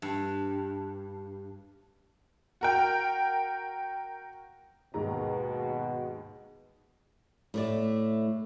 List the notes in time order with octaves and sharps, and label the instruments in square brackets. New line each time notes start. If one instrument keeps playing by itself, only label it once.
[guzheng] G2
[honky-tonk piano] F#4 A#4 G5
[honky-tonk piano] D#2 G#2 A#5 [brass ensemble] B2
[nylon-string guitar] A2 A3 D5